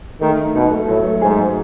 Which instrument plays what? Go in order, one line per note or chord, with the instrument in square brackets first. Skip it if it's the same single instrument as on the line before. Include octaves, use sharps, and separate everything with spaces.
[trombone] D#3 [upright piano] A3
[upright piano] D#4
[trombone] B2 [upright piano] D#4
[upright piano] A3
[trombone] A2 [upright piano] F#3
[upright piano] A3
[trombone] G#2 [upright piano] G#4
[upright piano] F#3